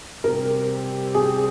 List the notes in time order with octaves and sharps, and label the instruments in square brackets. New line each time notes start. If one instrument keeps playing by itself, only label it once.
[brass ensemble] C3 G3 C4 G4 [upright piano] A#4
[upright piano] G#4